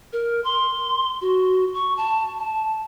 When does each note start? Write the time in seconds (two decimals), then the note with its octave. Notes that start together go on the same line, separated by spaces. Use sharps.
0.13 A#4
0.44 C6
1.21 F#4
1.74 C#6
1.97 A5
2.39 A5